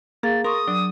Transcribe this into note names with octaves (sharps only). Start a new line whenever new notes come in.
A#3 G#4 F5 A6
A#4 C6 C#6 D#6
F#3 D4